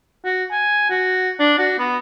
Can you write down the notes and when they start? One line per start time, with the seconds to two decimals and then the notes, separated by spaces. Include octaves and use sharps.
0.25 F#4
0.51 G#5
0.90 F#4
1.39 D4
1.58 F#4
1.79 B3